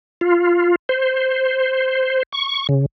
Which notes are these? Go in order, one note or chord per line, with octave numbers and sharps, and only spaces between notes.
F4
C5
C#6
C#3